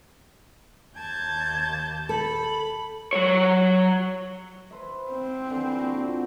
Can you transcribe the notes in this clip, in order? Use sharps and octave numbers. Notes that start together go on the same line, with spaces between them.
D#2 A5 G6 G#6
A4 B5
F#3 C#5
B4 C5 E5
C4
D3 E3
A#2 F#4